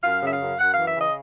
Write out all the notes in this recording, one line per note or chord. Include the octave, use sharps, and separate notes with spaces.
F#2 F5
C#3 E5
F5
F#2
F#2 F#5
E3 F5
E5
C#3 D#5